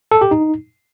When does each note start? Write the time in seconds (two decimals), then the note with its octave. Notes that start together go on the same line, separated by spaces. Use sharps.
0.11 A4
0.21 G4
0.31 D#4